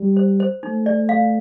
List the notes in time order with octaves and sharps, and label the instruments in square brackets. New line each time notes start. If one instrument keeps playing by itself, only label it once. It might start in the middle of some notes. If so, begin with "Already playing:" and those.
Already playing: [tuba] G3
[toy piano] C5
C5
[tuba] A3 [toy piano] D#4
[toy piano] D5
F5